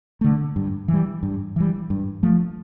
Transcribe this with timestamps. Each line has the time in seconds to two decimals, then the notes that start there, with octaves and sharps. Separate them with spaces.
0.21 D3 A3
0.56 G2
0.88 E3 G3
1.23 G2
1.56 E3 G3
1.90 G2
2.23 F3 A3